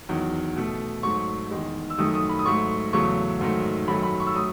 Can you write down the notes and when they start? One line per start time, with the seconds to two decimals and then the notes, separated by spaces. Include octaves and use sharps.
0.09 E2 D#3 F#3
0.56 B2 A3
1.03 G#2 F#3 A3 C#6
1.51 E2 D#3 G#3
1.90 E6
1.98 F#2 D#3 A3 D#6
2.14 D#6
2.29 B5
2.39 D#6
2.45 G#2 F#3 A3 C#6
2.93 E2 C#3 F#3 A3 C#6
3.41 G#2 D#3 F#3 A3
3.88 F#2 D#3 F#3 A3 B5
4.03 B5
4.20 C#6
4.27 E6
4.35 F#3 A3 D#6